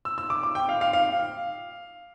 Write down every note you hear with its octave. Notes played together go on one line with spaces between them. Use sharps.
E6
E6
D6
D6
G5
F5
F5
F5